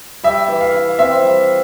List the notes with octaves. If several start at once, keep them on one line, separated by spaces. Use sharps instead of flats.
G3 E5
E3
F5
E4
C4 E5
G3